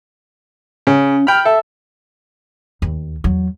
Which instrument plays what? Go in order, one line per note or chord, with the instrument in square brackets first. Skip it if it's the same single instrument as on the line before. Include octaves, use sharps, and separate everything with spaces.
[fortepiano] C#3 [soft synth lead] C#4
[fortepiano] G5 B5 [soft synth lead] F6
[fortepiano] A4 [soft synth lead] E5
[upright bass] D#2
E2 F#3